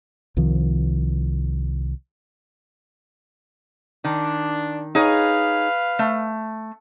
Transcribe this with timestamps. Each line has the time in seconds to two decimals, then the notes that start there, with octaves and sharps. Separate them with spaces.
0.37 C2 D#3 F3
4.04 D#3 D4
4.95 D#4 G#4 B4 C#5 F5
5.99 A3